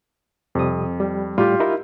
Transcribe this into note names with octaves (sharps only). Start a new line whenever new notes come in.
F2 C3 G3 D#6
G3
A2 G3 F4 G4
D#4 E4 A#4